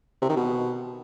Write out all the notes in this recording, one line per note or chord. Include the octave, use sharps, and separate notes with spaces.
C3
D#3
B2